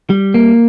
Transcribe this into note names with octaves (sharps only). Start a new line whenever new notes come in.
G3
A#3